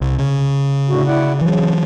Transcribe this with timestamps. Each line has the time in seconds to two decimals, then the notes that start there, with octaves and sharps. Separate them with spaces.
0.01 C2
0.18 C#3
0.89 A2 D3 F#4
1.07 E4 D5 F#5
1.41 C#3 E3 F#3